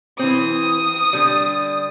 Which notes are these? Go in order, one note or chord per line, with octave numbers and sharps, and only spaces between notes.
E3 C4 D#6
D3 G3